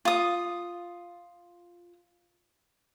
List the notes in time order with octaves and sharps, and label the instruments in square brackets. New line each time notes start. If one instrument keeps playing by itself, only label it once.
[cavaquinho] F4 D#6